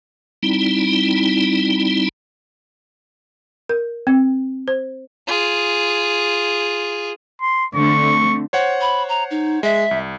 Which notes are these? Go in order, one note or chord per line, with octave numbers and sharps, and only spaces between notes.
G3 C4 D#4 E4
A#4
C4
C5
F4 G#4
C6
D3 A3 C4 C#6
C5 C#5 F#5
B5
A#5
D#4
G#3 E5
C2